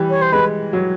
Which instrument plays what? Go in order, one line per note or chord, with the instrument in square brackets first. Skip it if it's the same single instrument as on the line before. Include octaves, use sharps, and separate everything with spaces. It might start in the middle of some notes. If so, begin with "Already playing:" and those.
Already playing: [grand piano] E3 G3
[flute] C#5
C5
[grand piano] G#3 [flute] B4
[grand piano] F#3